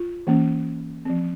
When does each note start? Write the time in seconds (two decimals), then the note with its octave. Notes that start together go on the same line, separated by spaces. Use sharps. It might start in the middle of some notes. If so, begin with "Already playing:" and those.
Already playing: F4
0.27 E3 A#3 C#4
1.05 F3 C4